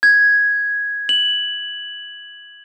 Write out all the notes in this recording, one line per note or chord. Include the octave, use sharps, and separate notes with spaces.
G#6
F#7